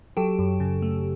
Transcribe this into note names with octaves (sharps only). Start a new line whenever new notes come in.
F#3 G4 A4
F#2
C#3
A3